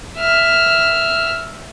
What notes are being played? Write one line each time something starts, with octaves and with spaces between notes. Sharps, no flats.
E5 F6